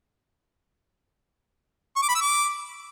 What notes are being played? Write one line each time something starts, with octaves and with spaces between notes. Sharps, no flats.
C#6
D6
B5
E6
D6